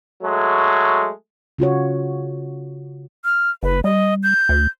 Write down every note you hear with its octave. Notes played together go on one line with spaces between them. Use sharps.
F#3 G#3 A3
C#3 F4 F#4 C#5
F6
F#1 B4
G3 D#5
G6
D2